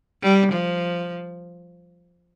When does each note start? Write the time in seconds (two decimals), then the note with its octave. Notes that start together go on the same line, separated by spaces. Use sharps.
0.23 G3
0.52 F3